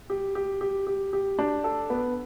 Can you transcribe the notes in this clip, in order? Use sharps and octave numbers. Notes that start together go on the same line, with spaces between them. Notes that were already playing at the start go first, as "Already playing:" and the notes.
G4
G4
G4
G4
G4
D4
A4
B3